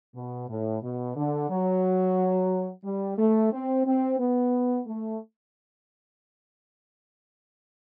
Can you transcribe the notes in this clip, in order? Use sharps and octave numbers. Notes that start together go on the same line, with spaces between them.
B2
A2
B2
D3
F#3
G3
A3
C4
C4
B3
A3